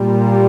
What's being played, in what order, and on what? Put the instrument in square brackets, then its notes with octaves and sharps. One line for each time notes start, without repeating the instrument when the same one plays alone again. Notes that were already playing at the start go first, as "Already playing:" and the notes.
Already playing: [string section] A#2 G3